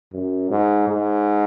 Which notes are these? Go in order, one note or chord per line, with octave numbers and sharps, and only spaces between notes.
F#2
G#2
G#2